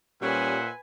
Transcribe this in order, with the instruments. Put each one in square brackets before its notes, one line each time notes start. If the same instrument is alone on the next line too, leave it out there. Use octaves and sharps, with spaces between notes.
[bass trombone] A#2 [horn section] G3 C#4 [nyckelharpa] B4 G#5 [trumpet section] C5 E5 F#5